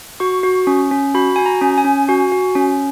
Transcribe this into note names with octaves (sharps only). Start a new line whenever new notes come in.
F#4 C#6
F#4
C#4
C#4
F#4 B5
F#4 G#5
A#5
C#4
G#5
C#4
F#4
F#4
C#4